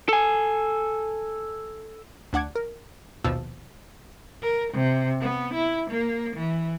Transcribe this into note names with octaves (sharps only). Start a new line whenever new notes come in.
A4 G#5
D2 D4 F#5 D6 G#6
A#4
A#1 D#2 B2 F3 A5 E6
A#4
C3
B3
E4
A#3
E3